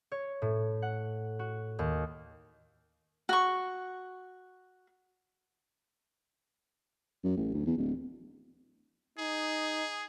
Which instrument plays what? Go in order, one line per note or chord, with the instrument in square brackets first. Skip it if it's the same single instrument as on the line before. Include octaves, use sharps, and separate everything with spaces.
[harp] C#5
A2
F#5
F#4
D#2
[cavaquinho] F#4 C#6
[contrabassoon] F#2
A1
D2
E2
D1
[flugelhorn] D#4 [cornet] G#4